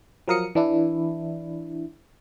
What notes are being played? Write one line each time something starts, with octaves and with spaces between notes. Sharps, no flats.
F3 F#3 A#4 F5 D#6 C#7
E3 D4 E4